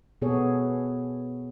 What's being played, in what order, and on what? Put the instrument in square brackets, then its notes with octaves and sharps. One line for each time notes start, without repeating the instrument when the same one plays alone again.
[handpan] B2 B3 G#4 A4 C#5